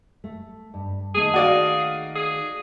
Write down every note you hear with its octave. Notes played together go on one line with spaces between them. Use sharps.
A3
G2
D#3 A3 A#3 G#4
F#4 D5 F5
G#4